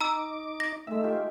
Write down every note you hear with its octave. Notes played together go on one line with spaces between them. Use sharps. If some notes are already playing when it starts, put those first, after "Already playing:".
D#4 A#5 D6 E6
A#6
D#3 G#3 A3 E5
F4 G4 E5